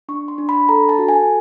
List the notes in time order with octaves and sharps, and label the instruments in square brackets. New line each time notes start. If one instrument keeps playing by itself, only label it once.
[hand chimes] D4 C#6
C6
D4
B5
A4 A#5
A5
F#4
G#5